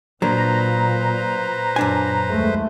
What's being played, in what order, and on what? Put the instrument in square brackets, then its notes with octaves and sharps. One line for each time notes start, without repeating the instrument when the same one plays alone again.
[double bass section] A#2 [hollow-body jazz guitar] F#3 A#3 D4 [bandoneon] B4 C5 [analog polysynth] A#5
[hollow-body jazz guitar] F#2 D4 G#5 [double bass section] A#2
[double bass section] D#2 G#3 A3